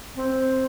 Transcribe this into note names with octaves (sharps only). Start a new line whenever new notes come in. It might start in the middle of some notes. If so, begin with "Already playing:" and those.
C4